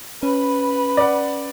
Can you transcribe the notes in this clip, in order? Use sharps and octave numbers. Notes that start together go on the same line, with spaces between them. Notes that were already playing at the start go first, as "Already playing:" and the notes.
C#4 B4 B5
D5 F#5